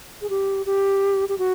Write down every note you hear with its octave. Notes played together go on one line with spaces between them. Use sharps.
G#4
G4
G4
G4
F#4